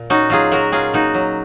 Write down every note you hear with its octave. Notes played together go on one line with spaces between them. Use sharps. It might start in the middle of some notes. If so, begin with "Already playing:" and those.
Already playing: A#2
C#4 D#4 F#4
F#3 F4 G#4
F#3 F#4 A#4
C#4 F4 G#4
A#3 D#4 F#4
F#3